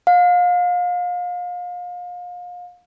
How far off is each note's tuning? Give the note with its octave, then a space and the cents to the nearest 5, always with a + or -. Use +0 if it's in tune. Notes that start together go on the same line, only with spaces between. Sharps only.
F5 +35